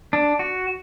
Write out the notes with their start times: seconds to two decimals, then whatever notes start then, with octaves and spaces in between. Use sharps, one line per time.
0.13 D4
0.39 F#4